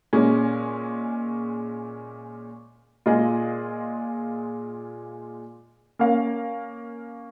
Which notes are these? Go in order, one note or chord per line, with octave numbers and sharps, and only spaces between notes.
A#2 G#3 C#4
A#2 G#3 F4 G#4 D#5
A#3 C#4 A#4 F5